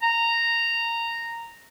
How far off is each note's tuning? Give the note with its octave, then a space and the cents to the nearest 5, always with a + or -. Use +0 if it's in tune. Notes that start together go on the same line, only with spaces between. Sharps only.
A#5 -10